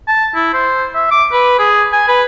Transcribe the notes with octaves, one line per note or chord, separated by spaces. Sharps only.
A5
E4
C5
E5
D6
B4
G#4
G#5
B4